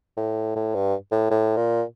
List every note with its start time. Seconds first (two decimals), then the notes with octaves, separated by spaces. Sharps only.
0.17 A2
0.56 A2
0.75 G2
1.12 A2
1.31 A2
1.56 A#2